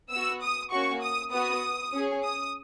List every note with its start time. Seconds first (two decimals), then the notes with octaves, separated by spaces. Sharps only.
0.10 B3 F#4 E6
0.42 D#6
0.71 A#3 C#4 F#4 C#6
1.01 D#6
1.32 B3 F#4 D#6
1.93 C#4 G#4
2.23 D#6